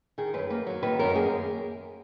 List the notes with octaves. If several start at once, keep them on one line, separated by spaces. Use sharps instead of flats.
D#3 G#4
F#2 B4
A#3 B4
F#3
D#3 B4
F#2 A#4
A#3 G#4